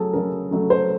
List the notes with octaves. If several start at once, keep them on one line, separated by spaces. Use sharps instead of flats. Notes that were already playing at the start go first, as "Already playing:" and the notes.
Already playing: C#3 F#3 A3 G#4 A4
C#3 F#3 A3 A#4
C#3 F#3 A3
C5